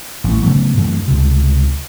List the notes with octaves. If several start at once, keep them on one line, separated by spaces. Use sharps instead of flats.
A1 A3
C#3 F#3 A3 B3
F#2 E3 A3
C#2 C3